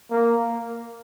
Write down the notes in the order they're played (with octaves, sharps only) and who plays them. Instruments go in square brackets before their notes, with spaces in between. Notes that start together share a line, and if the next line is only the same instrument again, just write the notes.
[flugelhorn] A#3